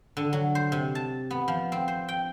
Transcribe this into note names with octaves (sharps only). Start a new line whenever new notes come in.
D3
F#3
C5
C3
A5
B3
F3
C4
C5
G5